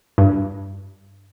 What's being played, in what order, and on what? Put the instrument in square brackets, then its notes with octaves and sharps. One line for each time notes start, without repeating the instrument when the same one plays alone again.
[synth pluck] G2